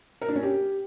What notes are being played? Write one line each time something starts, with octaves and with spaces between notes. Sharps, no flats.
A#4
D4
C#4
G4